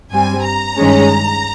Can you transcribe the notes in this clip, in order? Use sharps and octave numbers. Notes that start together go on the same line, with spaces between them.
G2 G3 C4 G#5
A#5
G2 D#3 G#3 C#4